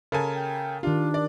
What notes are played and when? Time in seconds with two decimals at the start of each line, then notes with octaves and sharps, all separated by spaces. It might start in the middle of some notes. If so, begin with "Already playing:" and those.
0.12 C#3 A4 A#4 G#5
0.35 G5
0.83 D#3 D4 F4 G4
1.14 D5